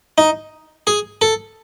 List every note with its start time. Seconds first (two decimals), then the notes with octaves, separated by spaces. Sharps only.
0.18 D#4
0.87 G#4
1.22 A4